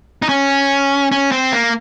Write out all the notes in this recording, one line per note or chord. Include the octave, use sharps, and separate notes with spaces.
D#4
C#4
C#4
C4
A#3